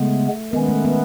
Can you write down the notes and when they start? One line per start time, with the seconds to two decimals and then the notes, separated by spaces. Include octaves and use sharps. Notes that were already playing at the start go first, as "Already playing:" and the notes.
Already playing: C#3 G#3 A3 B3
0.53 D#3 G#3 B3 C#4
0.68 A3
0.85 B3